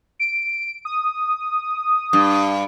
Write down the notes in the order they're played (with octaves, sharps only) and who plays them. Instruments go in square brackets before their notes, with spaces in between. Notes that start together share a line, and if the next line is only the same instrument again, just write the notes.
[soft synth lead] D7
D#6
[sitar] G2